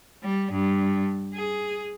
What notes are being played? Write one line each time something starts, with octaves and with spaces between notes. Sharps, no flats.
G3
G2
G#4